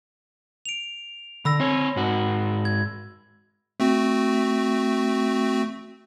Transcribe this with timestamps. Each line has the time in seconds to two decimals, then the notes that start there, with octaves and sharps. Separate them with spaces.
0.66 D7 F7
1.45 D3 B5 E6 A#6
1.60 C4 C#5
1.96 G#2 F#4
2.65 G#6
3.80 A3 C4 F#4